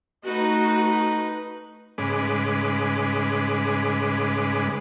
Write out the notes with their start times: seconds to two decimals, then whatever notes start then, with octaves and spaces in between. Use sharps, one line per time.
0.24 A3 D#4 F#4 B4
1.98 G#2 C#3 G#3 B4 D6